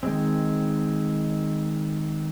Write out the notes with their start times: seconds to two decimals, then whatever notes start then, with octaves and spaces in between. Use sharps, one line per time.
0.03 D#3 G#3 C4